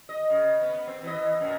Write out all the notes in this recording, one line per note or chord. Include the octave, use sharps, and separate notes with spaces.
D#5
C#3
B3
C4
E3 D#5
F#2 A#2